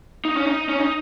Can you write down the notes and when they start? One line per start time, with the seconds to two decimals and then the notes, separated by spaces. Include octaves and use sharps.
0.25 D#4
0.37 C#4
0.47 D#4
0.69 C#4
0.80 D#4